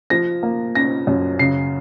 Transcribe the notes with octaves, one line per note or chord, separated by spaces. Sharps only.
F3 A#6
A#3
C#4 A#6
F#2
C#3 C7